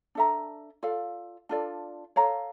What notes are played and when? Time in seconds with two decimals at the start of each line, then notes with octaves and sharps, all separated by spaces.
0.15 D4 A4 E5 A#5
0.83 F4 A4 D5 F5
1.49 D4 F4 A4 D5
2.16 A4 C#5 F5 A#5